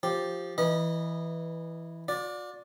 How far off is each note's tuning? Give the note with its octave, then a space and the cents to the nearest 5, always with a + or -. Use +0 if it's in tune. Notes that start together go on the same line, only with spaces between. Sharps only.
F3 +10 G4 +0
E3 +0 D#5 -20 B5 -45
F#4 -45 D5 +0